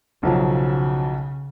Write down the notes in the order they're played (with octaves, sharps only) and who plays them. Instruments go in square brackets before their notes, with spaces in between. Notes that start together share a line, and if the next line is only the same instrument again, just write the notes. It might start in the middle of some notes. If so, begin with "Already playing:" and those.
[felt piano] B1 F3 F#3 [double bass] C#3